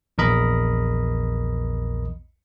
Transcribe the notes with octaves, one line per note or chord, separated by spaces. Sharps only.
A#1 E2 A#4 D#5 B5